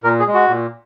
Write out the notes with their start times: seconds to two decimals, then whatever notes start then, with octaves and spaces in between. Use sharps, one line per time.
0.04 A#2 A#4
0.19 G#4
0.27 G#3
0.34 F#4
0.49 A#2